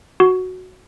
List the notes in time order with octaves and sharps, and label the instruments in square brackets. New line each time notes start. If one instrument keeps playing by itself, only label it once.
[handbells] F#4